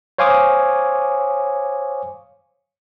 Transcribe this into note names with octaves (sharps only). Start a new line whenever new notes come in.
C5 C#5 F5 G#5 D6 D#6